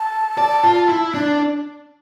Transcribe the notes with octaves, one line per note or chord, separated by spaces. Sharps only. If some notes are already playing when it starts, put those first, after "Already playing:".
Already playing: A5
D5
F4
E4
D4 D5